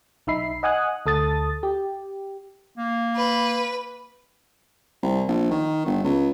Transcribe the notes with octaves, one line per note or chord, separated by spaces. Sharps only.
B1 D#4 E5 B5 C7
D#5 F#5 G#5 D#6 F#6
D2 A4 D#6 A6
G4
A#3
B4
C2
A#1
D#3
G1
C#2